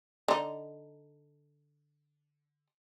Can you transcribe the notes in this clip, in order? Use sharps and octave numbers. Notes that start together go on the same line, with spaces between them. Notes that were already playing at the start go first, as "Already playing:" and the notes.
D3 D#4